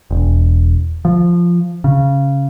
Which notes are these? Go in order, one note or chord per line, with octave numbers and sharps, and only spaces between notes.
E1
F3
C#3